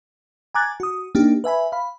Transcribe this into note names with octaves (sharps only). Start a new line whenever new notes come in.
G#5 A#5 D6 F#6 G#6 A6
F#4 D#6
A#3 D4 D#4 G4
B4 E5 G#5 B5
F5 B5